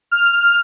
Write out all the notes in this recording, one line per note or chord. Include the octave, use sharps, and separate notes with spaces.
F6